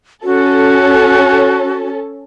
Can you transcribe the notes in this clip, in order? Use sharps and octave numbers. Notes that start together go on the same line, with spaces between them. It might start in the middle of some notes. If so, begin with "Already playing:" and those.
C#4 F#4 A4